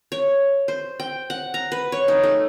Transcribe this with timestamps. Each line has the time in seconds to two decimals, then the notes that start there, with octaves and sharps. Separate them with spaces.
0.12 C#5
0.68 C5
1.00 G5
1.30 F#5
1.54 A#5
1.72 B4
1.92 C#5
2.08 D#4
2.23 A3